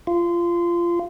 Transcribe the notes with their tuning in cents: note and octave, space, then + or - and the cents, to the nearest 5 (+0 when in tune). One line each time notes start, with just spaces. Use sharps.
F4 -20